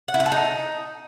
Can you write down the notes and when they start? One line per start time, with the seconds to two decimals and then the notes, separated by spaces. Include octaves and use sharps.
0.08 F#5
0.14 E4
0.20 F#5
0.26 A4
0.32 D#4